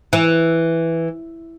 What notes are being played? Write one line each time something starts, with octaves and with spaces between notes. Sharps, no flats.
E3